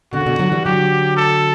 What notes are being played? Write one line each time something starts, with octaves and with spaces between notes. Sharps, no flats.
B2 D3 F#4
C#3
B2 D3
D3 F#3
E3 G3
D3 F#3 G4
A4